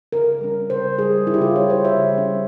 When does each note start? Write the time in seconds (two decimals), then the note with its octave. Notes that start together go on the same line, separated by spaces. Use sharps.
0.13 C#3 A#4
0.41 G3 C#4
0.70 C#3 C5
0.99 G3 C#4 G#4
1.27 C#3 E4
1.34 G4
1.41 F4
1.55 G3 C#4 C#5
1.70 C5
1.84 C#3 E5
2.13 G3
2.18 C#4